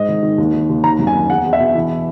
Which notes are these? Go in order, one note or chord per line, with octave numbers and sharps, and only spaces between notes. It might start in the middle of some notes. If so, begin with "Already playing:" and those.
Already playing: G#2 D#5
D#3
D#3
D#2
D#3
D#2
D#3 A#5
F#2
G#5
D#3
E2 F#5
E2
E5
B2
E3